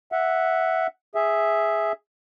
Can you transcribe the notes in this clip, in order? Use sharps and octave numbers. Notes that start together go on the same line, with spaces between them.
E5 F#5
G#4 E5